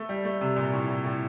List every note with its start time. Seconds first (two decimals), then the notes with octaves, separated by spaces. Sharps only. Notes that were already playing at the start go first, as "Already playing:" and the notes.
Already playing: A3
0.09 G3
0.25 A3
0.41 C3
0.56 A#2
0.72 A2
0.88 A2
1.04 A2